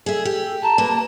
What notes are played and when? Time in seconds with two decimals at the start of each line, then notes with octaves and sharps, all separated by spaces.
0.06 G#4 A4 E5
0.25 G4
0.63 A5 A#5
0.78 A#3 B4